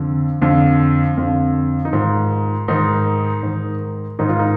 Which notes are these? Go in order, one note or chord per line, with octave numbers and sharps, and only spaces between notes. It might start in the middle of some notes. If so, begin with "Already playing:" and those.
Already playing: F2 D3
F2 D3
F2 D3
D#4
G#2 D#3 F4
G#2 D#3 D#4
G#2 D#3
G#2 D#3 D#4
F4
D#4